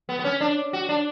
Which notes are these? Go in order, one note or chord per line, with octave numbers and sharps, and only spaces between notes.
B3
B3
C#4
D4
F#4
D4